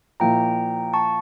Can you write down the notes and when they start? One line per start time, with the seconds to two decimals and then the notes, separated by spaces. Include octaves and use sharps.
0.20 A#2 F3 A#3 E4 G5 A#5
0.94 A5 C#6